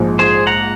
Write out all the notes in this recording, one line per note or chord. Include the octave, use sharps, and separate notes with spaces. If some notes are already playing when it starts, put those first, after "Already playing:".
Already playing: A#1 G#2 F3 G#3
G#4 C5
F#5 A#5